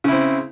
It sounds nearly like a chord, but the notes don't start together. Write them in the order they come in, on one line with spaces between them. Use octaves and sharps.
C#3 E4 C4